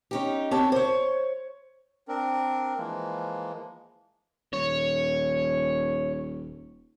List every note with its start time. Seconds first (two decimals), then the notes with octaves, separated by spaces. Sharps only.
0.11 C#4 D#4 G4
0.51 C4 G4 C#5 A5
0.72 C5 C#5
2.08 C4 D4 A#4
2.77 E3 F3 G#3 A#3
4.53 D#1 C#5